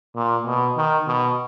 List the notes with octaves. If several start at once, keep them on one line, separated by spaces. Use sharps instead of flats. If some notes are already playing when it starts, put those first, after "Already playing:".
A#2
B2
D#3
B2